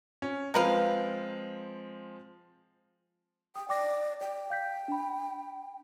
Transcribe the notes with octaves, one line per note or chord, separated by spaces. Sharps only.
C#4
F3 G#3 C4 A#4 B4 F5
G5 D#6
D5 G5 D6 A#6
D5 G5
F5 G6 B6
D4 B5